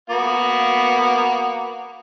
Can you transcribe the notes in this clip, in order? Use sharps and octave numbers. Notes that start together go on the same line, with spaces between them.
A#3 B3 F#4